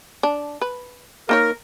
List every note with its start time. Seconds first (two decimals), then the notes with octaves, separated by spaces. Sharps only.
0.23 D4
0.61 B4
1.29 A#3 D#4 A#4 C#5